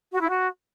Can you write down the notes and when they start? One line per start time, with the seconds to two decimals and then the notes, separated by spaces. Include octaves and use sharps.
0.12 F#4
0.20 E4
0.28 F#4